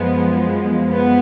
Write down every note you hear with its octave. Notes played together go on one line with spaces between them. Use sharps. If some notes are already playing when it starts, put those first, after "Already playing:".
Already playing: F#2 F3 G#3 B3
B3